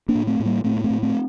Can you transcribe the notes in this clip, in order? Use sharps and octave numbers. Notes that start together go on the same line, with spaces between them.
A#3 D4
A2
A3 C4
A2
G3 A#3
A2 A3 C4
A#3
A3 C4
A2
A3 C4